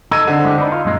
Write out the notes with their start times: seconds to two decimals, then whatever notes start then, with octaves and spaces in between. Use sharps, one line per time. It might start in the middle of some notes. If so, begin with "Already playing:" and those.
0.11 D#4 A4 E6 G#6 D#7
0.28 D3 C4
0.45 G#3 E4 G4
0.58 D4 D#4 B4
0.72 F4
0.85 F#2 A#2 G#3